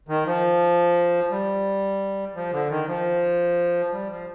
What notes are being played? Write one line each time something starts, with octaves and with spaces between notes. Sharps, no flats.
D#3
F3
G3
F3
D3
D#3
F3
G3
F3